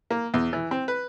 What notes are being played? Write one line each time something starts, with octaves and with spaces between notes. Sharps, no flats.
A#3
E2
E3
C4
B4